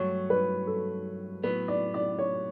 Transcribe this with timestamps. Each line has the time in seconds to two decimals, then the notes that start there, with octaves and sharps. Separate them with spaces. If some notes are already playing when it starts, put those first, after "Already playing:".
Already playing: G2 F#3 A3 C#5
0.30 B4
0.67 A4
1.43 A2 F#3 B3 B4
1.68 D5
1.94 D5
2.19 C#5